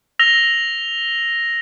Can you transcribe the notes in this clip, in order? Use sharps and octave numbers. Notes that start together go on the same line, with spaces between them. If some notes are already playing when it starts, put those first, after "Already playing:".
E6 A#6 F7 G7